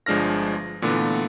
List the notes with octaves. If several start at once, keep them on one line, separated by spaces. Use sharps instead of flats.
G1 F3 G#3 D4 F6 A#6
A#2 D3 E3 A3 B3